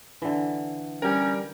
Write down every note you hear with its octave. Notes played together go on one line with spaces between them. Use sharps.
D3 E3
G3 C#4 G4 A#4